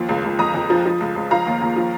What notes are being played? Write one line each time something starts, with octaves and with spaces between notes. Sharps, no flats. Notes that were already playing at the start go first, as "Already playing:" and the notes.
Already playing: D#2 F3
C#2
C#2
F2 A#5 D#6
F2
F3
F3
C#2
C#2
F3 F5 A#5
D#2
D#2
F3